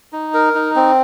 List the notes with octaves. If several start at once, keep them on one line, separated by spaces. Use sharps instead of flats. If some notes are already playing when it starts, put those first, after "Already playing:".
D#4
A#4
D#4
C4